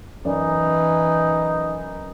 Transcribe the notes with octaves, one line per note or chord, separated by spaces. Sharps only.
F#2 E3 D#4 D5